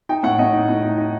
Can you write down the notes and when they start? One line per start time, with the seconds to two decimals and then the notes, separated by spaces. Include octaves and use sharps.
0.09 D#4 G5
0.23 A2 F#5
0.39 A2 D#5
0.53 D#4
0.69 A2
0.83 D#4
0.98 D#4